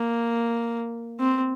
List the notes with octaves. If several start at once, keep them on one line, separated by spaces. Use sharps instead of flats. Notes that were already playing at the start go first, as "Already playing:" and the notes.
Already playing: A#3
C4